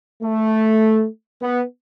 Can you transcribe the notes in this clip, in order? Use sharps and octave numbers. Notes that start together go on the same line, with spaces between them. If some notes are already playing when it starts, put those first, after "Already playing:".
A3
B3